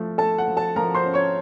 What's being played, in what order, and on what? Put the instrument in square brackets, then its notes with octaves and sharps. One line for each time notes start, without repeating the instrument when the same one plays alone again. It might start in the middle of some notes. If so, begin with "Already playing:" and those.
Already playing: [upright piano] F3 A3
A3 A4 A5
F#5
F3
A4 A5
F3 A#4 A#5
C5 C6
C#4
C#5 C#6